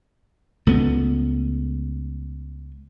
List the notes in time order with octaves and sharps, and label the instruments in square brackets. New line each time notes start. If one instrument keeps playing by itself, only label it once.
[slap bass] C#2 A3 B3